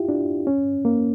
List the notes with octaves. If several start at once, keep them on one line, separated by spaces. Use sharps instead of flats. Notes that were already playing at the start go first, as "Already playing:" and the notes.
Already playing: E4 F4 G4
D4
C#4
A#3